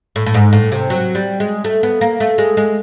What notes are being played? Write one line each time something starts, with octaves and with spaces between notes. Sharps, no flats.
A2
A2
G#2
A2
C3
F#3
G3
G#3
A3
B3
A#3
A3
G#3
G#3